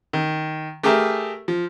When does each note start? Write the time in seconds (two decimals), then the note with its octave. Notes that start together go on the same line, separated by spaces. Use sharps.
0.13 D#3
0.83 A3 G4 G#4 A#4 E5
1.48 F3